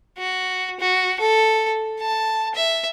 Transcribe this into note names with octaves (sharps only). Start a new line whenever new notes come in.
F#4
F#4
A4
A5
E5